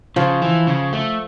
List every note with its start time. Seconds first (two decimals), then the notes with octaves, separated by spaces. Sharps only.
0.16 C#3 F3
0.42 E3
0.67 C#3
0.93 A3